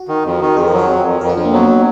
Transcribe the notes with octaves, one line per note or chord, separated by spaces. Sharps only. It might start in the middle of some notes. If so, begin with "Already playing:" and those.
Already playing: F#4
D#3
F2
D#3
F2 G#4
A#4
F#3
A#4
F2
F2
F2 A#4
F4
F2 D4
A#3
F#3 B3